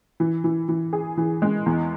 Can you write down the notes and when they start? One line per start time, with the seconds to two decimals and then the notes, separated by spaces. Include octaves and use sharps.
0.20 E3
0.44 E3
0.69 E3
0.93 G#4
1.17 E3
1.42 G#3
1.66 E2